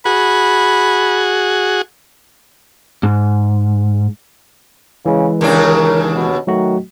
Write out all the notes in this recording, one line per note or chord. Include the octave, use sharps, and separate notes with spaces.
F#4 G#4 B5
G#2
C#3 E3 G#3
D#2 C#3 D4 A#4
B2
D#3 F#3 A3 F#4